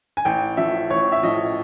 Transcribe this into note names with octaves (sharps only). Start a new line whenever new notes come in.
G#5
A1 G5
A2 F3 E5
A1 C#5
E5
A2 F3 D#5